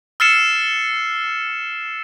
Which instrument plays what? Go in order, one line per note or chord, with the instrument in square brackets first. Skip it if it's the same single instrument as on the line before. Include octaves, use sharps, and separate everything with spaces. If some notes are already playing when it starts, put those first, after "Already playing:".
[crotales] E6 F6 A6 C7 C#7 E7